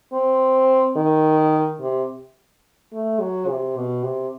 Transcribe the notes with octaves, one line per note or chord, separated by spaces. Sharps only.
C4
D#3
C3
A3
F#3
C3
B2
C3